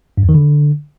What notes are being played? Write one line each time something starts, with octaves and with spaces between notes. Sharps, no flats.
G2
E2
D#3
D3